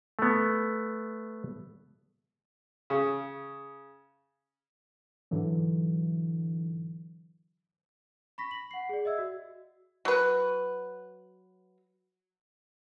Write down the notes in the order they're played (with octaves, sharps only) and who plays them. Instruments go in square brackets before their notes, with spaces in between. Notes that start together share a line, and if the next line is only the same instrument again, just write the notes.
[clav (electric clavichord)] A3 B3
[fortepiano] C#3
[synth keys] G#2 D3 E3 F#3
[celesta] B5 C#6 A#6 B6
F#7
F#5 C7
G#4 D5
D#5 E5 E6 G#6
F#4
[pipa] F#3 B4